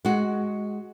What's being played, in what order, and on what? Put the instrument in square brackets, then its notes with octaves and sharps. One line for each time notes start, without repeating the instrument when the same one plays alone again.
[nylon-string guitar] G#3 F#4